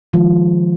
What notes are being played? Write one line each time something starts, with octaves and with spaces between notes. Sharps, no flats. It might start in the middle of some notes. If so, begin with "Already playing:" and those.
D#3 F3 G#3 F4